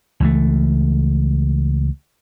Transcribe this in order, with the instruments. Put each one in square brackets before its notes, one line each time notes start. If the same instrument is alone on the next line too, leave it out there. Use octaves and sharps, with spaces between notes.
[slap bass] C#2 E3 A3